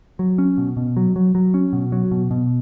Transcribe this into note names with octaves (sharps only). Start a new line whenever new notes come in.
F#3
C#4
B2
B2
F#3
F#3
F#3
C#4
B2
F#3
B2
B2